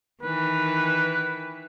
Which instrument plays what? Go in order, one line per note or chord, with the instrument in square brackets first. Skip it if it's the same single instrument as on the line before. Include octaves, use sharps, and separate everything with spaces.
[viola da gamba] D#3 E3 [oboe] B4